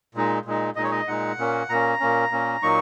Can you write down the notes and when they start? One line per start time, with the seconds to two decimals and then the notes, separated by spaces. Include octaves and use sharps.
0.15 A#2 G#3 D#4
0.46 A#2 G#3 D#4
0.76 A#2 G#3 D#4 D#5
0.84 C#5
0.91 D#5
1.08 A#2 G#3 D#4 F#5
1.38 A#2 A#3 C#4
1.69 A#2 A#3 C#4 A#5
2.00 A#2 A#3 C#4
2.31 A#2 A#3 C#4
2.63 A#2 F#3 A#3 D#4 C#6